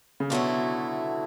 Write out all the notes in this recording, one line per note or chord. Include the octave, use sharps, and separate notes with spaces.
C#3
B2 D3 F#3 A3 E4